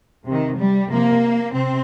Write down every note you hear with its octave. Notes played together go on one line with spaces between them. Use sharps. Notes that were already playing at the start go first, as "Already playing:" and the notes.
C3 D#3
G3
C3 F3 A#3
C3 C4